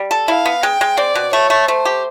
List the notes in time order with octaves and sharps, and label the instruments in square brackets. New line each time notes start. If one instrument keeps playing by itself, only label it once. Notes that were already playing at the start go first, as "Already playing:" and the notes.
Already playing: [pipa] G3
A4
[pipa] E4 [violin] F5
[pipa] B3
[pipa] G#3 [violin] G5
[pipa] G#3
[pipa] C4 [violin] D5
[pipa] B2
[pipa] A3 [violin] C#5
[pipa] A3
[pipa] A3 [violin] C5
[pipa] G4